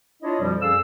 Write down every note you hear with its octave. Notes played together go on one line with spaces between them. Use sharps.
D4 E4 F4 C#5 D#5
F2 B2 F3 G3
F#2 G#4 A4 F5 E6